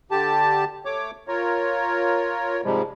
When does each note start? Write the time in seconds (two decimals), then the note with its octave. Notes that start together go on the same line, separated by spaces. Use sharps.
0.11 D3 G4 A5
0.85 A3 C#5 D6
1.28 F4 A#4 C#5
2.64 G#2 C3 F3 G3 G#3